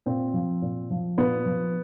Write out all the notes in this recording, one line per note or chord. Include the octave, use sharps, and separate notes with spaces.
A#2 C4
F3
A#2
F3
A#2 B3
F3